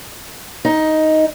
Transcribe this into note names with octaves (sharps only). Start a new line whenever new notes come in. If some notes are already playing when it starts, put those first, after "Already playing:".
D#4